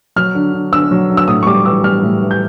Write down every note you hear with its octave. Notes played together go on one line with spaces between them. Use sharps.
F#3 F6
D3
D3
D3 E6
F#3
D3
E6
A2 D#6
C#6
G3 D6
E3 E6
G3 F6
A2
E3
G6